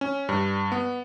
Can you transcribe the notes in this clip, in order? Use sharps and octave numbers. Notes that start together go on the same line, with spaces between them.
C#4
G2
B3